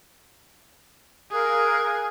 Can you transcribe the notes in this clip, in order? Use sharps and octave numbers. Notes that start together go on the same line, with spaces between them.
G#4 A#4 F5 F#6